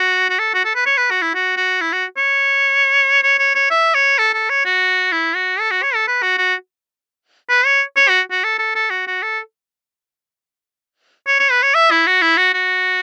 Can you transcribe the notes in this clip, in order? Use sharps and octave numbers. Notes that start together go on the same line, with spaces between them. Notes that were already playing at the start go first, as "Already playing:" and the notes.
Already playing: F#4
F#4
A4
F#4
A4
B4
C#5
B4
F#4
E4
F#4
F#4
E4
F#4
C#5
C#5
C#5
C#5
E5
C#5
A4
A4
C#5
F#4
E4
F#4
A4
F#4
C#5
A4
B4
F#4
F#4
B4
C#5
C#5
F#4
F#4
A4
A4
A4
F#4
F#4
A4
C#5
C#5
B4
C#5
E5
E4
F#4
E4
F#4
F#4